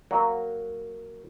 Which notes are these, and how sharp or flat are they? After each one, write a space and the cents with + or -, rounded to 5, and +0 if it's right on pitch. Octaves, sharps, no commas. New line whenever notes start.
F#3 +0 A#3 -10 F#5 +0